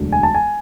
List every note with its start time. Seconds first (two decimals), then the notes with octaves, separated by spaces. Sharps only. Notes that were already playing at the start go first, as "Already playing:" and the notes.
Already playing: E1 D2 D3 F#3
0.12 G#5
0.23 A5
0.35 G#5